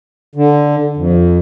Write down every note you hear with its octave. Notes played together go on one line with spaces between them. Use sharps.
D3
F2